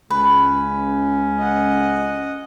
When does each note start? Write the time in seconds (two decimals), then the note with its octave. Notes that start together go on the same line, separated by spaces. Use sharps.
0.10 C#2 C#4 B4
1.39 D#5 F#5